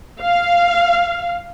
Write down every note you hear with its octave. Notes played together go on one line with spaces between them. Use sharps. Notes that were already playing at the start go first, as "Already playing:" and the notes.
F5